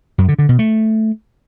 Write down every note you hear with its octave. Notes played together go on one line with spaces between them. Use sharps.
F#2
D3
D3
B2
A3